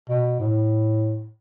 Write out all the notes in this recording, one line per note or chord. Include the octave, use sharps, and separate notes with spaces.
B2
A2